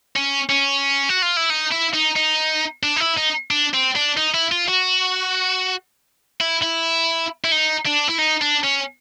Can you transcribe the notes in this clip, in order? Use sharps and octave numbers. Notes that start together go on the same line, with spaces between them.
C#4
C#4
F#4
F4
E4
D#4
E4
D#4
D#4
D4
D#4
E4
D#4
D4
C4
D4
D#4
E4
F4
F#4
E4
E4
E4
D#4
D4
E4
D#4
D4
C#4